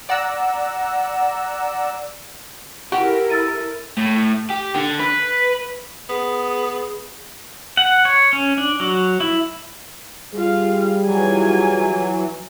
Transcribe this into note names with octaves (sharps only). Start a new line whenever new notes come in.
D5 F#5 A#5 E6
E4 F#4 G4 A4 A#4
E6 A6 D#7
A2
G4
D3
B4
B3 G#4
F#5
C#5
C#4
D4
F#3
E4
G3 F4 G#4 F5
E3 F#3 F4 G#5